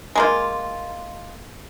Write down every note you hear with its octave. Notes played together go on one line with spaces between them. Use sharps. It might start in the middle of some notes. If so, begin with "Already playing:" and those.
G#3 A#3 F4